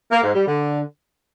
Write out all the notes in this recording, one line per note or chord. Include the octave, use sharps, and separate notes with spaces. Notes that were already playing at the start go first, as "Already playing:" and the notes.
A#3
G#2
G3
D3